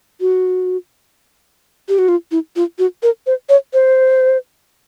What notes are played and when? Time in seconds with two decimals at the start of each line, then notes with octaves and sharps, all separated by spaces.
0.21 F#4
1.89 G4
1.99 F#4
2.08 F4
2.31 E4
2.56 F4
2.79 F#4
3.03 A#4
3.27 C5
3.49 C#5
3.74 C5